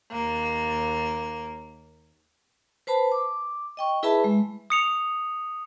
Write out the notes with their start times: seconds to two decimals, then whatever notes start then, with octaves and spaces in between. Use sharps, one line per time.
0.12 D#2 A#3
2.87 B4 C5 A5 B5
3.12 D6
3.77 D#5 G5 C#6
4.03 E4 G#4 B4 E5 A5 B5
4.24 G#3
4.70 D#6 C#7 F7